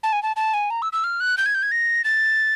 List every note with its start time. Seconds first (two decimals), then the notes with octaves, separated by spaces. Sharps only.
0.03 A5
0.13 G#5
0.23 A5
0.36 A5
0.54 G#5
0.70 A#5
0.82 E6
0.93 E6
1.04 F6
1.20 F#6
1.38 G6
1.46 G#6
1.55 G6
1.63 G#6
1.72 A#6
2.05 A6